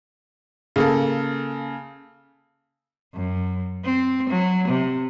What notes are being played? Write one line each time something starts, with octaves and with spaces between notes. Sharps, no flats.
C#3 A#3 A4
F#2
C4
F#3
C3